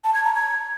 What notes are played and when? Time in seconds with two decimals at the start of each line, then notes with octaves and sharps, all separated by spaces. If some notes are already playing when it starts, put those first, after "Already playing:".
0.04 A5
0.14 G#6
0.24 A#5
0.35 G#6